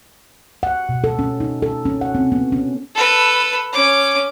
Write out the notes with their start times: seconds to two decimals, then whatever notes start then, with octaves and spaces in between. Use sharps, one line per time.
0.63 F#5
0.89 B2
1.04 A4
1.19 C#4
1.40 D#4
1.62 A4
1.85 C#4
2.01 F#5
2.15 C4
2.32 B3
2.52 C#4
2.95 A4 B4
3.73 C#4 D6